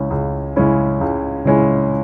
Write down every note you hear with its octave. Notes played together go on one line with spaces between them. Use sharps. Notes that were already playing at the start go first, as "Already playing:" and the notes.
Already playing: C#2 C#3 G#3 C#4 E4
C#2
C#3 G#3 C#4 E4
C#2
C#3 G#3 C#4 E4